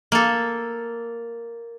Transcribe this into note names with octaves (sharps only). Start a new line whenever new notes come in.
A#3 A4